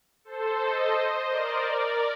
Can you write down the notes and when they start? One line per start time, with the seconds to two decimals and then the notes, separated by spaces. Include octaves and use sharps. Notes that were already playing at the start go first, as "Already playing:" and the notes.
0.25 A4 C5
0.59 C5 D#5
1.29 A#4 D5
1.63 A#4 D5